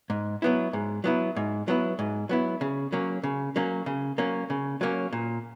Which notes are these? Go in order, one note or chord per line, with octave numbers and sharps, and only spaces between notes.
G#2
F#3 B3 E4
G#2
F#3 B3 E4
G#2
F#3 B3 E4
G#2
F#3 B3 E4
C#3
F#3 A#3 C#4
C#3
F#3 A#3 C#4
C#3
F#3 A#3 C#4
C#3
F#3 A#3 C#4
A#2